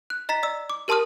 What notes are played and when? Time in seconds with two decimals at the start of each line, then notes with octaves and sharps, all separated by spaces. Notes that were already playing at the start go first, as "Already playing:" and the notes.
0.10 F#6
0.29 D#5 A#5 A6 B6
0.43 D5 E6
0.70 D6
0.88 G4 A#4 A5 C6 D#6 F6